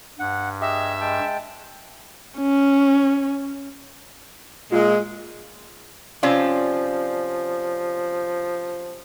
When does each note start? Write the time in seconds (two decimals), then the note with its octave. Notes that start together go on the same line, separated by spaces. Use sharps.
0.19 G2 F#5
0.61 G4 G#4 D#5 E5
1.01 G#3 G5 A5
2.38 C#4
4.72 A#2 G#3 F4
6.23 C3 F3 C#4 F4 D5